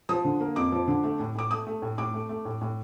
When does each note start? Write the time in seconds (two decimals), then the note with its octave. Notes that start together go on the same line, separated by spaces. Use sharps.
0.09 F3 D#6
0.25 D3
0.41 A#3
0.56 F2 D6
0.72 F3
0.88 D3
1.04 A3
1.20 A2
1.35 A2 D6
1.51 A3 D#6
1.67 A3
1.82 A2
1.98 A2 D6
2.14 A3
2.29 A3
2.45 A2
2.61 A2